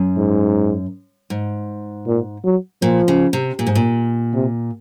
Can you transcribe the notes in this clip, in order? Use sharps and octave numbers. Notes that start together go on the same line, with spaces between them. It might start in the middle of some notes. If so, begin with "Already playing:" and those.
Already playing: F#2
G#2
G#2
A#2
F#3
A#2 F3
C#3
C3
A#2
G#2
A#2
C3